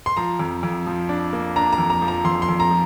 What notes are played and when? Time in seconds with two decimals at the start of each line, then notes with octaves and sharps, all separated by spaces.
0.06 C6
0.17 F3 A#5
0.39 F2
0.63 F2
0.87 F3
1.09 D4
1.33 A#3
1.56 D4 A#5
1.72 A#5
1.78 F2
1.90 A#5
2.02 F3
2.08 A#5
2.25 F2 C6
2.42 C6
2.48 F2
2.60 A#5
2.71 F3